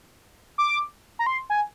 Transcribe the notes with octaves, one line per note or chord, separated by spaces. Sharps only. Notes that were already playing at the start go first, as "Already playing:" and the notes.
D6
A#5
C6
G#5